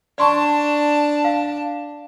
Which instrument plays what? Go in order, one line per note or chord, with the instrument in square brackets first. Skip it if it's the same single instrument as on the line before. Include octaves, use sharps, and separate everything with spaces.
[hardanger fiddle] D4 A5 [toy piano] D5 C6 C#6
[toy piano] F5